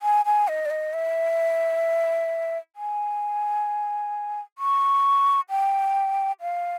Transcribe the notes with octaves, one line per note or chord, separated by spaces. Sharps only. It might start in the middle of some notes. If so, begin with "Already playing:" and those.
G#5
G#5
D#5
D5
D#5
E5
G#5
C#6
G5
F5